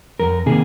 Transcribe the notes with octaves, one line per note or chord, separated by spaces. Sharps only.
F2 A#4
C3 D#3 A#3 G#4